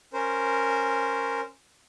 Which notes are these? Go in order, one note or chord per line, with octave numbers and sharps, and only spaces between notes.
C#4 A#4 C5